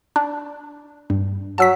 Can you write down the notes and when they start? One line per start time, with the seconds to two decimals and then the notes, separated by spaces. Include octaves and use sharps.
0.16 D4
1.10 G2
1.58 F#3 A5 E6 B6